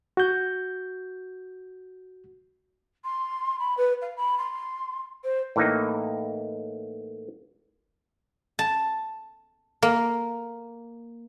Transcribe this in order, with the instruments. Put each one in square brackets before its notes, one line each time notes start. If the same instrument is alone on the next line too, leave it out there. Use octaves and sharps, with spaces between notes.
[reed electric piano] F#4 G6
[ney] C6
B5
B4
F5
B5
C6
C5
[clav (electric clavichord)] A2 E3 A#3 D#4
[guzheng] A5
A#3